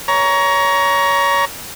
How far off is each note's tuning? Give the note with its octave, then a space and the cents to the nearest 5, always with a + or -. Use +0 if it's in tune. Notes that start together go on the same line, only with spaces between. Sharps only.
C#5 +20 A#5 +15